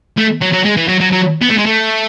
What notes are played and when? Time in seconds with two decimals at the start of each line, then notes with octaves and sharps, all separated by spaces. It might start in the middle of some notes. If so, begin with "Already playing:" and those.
0.18 A3
0.42 F#3
0.53 F#3
0.65 G#3
0.77 E3
0.88 F#3
1.01 F#3
1.12 F#3
1.42 B3
1.50 A3
1.58 G#3
1.66 A3